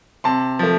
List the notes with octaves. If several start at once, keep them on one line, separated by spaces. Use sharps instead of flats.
C3 A5 C6
F3 A3